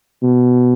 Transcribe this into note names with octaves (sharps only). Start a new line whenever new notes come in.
B2